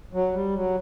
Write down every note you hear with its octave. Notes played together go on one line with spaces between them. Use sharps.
F#3
G3
F#3